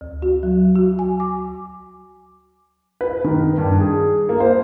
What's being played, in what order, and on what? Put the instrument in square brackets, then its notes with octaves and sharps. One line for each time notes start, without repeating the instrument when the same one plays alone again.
[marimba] D2
F#4
F#3
F#4
G#5
D6
[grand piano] B4
D#3
G2
G#4
A#3
C5